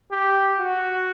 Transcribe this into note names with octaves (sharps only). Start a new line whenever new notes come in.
G4
F#4